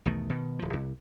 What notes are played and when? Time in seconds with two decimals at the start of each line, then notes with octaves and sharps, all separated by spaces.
0.05 B1 E2 D#3 A3
0.30 B2 D#3
0.59 D1 F3
0.73 C2